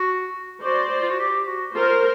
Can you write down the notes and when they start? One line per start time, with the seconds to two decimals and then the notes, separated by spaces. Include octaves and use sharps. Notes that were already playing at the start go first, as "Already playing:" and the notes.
Already playing: F#4
0.64 F#4 C5 D5
1.02 F4
1.10 F#4
1.19 G4
1.47 F#4
1.74 F4 A#4 C5